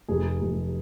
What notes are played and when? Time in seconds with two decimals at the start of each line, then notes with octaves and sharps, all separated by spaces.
0.08 F1 G#4
0.41 F1